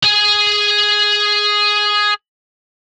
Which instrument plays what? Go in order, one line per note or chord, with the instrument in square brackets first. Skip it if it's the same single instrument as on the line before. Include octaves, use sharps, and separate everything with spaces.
[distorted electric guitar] G#4 G#5